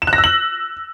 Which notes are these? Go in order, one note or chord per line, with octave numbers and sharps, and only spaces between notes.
E7
F#6
A#6
E6
F#7